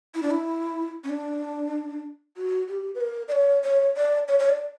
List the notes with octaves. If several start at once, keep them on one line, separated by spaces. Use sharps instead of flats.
E4
D4
E4
C#4
D4
F#4
G4
B4
A#4
D5
C#5
C#5
D5
C#5
C#5
D5